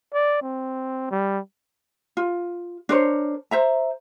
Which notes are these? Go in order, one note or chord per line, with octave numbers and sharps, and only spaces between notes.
D5
C4
G3
F4
D4 A#4 C5 C#5
C5 E5 A#5